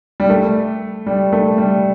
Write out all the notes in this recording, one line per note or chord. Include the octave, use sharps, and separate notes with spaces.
G3
A3
G3
A3
G3